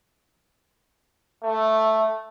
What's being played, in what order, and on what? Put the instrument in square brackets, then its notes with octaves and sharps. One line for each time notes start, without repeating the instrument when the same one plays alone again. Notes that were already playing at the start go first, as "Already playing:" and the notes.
[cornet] A3